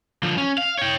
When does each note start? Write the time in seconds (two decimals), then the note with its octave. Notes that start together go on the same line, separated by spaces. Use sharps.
0.23 D3 F3
0.37 C#4
0.58 F5
0.78 C#5 G5